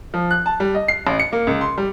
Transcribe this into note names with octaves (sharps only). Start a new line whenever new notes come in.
F3
F#6
A5
G3
D#5
C7
A1
C#7
A#3
C#2
C6
G3